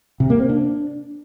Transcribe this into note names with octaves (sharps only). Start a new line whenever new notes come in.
C3
A#3
C4
D4